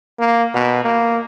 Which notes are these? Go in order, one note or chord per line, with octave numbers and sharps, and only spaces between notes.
A#3
B2
A#3